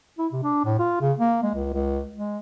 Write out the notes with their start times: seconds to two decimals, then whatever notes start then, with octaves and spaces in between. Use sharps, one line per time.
0.18 E4
0.32 C3
0.43 D4
0.65 A2
0.79 F4
1.01 C#3
1.19 A#3
1.43 G#3
1.55 C#2
1.74 C#2
2.15 G#3